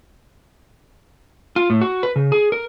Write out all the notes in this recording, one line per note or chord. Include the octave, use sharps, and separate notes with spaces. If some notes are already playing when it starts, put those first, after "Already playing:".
F4
A2
F#4
B4
C#3
G#4
A#4